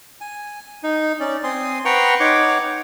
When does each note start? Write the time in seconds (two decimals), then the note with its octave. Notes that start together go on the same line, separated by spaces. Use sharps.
0.21 G#5
0.83 D#4
1.20 C#4 D5
1.44 C4 G#5 C6 D#6
1.85 B4 F#5 G5 A#5 C6 C#6
2.20 D#4 C#5 F#5 D6